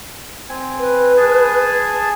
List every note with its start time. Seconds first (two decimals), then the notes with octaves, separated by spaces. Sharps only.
0.49 C4 G#5
0.80 B4
1.17 G#4 G#5 A5